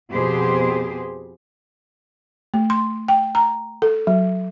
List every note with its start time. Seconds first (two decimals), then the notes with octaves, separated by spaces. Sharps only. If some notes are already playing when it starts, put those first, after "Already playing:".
0.13 F2 B2 B3 G4 G#4 C5
2.54 A3
2.70 C6
3.08 G5
3.35 A#5
3.82 A4
4.07 F#3